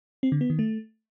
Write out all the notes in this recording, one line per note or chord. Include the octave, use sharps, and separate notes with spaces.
C4
D3
B3
D#3
A3